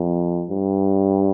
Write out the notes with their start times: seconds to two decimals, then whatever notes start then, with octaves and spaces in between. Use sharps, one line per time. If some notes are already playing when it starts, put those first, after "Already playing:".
Already playing: F2
0.49 G2